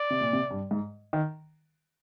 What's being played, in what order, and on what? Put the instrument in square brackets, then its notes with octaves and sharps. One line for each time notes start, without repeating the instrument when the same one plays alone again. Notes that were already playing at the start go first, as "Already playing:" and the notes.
Already playing: [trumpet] D5
[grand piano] C3
A#2
C3
G2
G#2
D#3